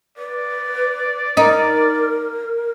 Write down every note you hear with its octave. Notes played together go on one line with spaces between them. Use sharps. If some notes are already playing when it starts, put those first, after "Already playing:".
B4 D5
D#4 A#4